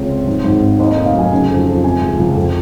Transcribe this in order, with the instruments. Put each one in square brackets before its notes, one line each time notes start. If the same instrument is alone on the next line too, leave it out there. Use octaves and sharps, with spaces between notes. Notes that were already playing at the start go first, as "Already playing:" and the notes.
Already playing: [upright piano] C#2 C3 C#5
C4
G#2
G#1
C4
D#2 D#5
F1 D#5
F5
F#3
G#5
C#3
F2
F2
C3 G#5
C#2
C#2
F2